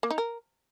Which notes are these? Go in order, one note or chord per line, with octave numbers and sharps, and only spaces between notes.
A#3
D#4
A#4